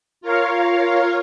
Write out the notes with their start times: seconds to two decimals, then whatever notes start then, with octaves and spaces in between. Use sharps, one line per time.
0.21 F4 A#4 C#5 F5